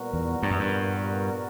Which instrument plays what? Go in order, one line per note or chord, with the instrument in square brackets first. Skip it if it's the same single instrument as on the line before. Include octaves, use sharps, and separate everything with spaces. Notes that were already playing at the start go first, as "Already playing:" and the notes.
Already playing: [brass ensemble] A#2 G3 B3 F#4 A#4
[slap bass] E2
G2
F#2
G2